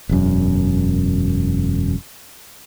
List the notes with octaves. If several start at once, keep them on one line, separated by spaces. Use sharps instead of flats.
E1 F#2